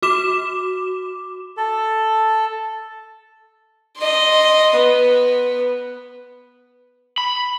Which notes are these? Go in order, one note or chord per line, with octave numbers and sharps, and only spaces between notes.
F#4 D6 E7
A4
D#5 C6
B3
B5